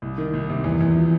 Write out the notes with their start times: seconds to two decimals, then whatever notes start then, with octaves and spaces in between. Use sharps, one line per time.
0.02 C2
0.18 D#3
0.33 C2
0.50 C3
0.64 E2
0.81 E2
0.97 F3